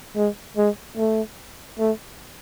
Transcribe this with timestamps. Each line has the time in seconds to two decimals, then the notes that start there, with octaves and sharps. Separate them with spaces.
0.16 G#3
0.57 G#3
0.97 A3
1.79 A3